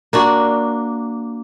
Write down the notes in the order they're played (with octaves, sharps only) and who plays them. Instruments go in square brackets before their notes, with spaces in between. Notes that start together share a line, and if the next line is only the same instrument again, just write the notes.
[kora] A#3 D4 F#4